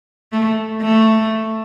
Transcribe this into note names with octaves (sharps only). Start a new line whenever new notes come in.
A3
A3